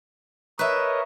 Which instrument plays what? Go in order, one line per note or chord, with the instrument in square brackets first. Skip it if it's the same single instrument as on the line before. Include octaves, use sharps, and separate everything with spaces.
[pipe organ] A#4 C#5 D#5 [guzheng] B4 E5